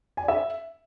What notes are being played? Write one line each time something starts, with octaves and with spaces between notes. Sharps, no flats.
G#5
D5
E5